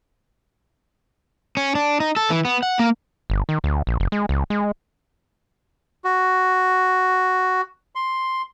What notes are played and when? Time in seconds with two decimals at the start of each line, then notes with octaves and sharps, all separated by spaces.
1.57 C#4
1.75 D4
2.00 D#4
2.16 A4
2.30 E3
2.45 B3
2.63 F#5
2.79 A#3
3.30 G1
3.49 D#3
3.64 D2
3.87 A#1
4.00 F#1
4.12 G#3
4.29 C#2
4.50 G#3
6.05 F#4
7.95 C6